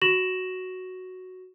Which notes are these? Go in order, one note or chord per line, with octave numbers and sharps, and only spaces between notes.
F#4 C#6 A#6 E7 F#7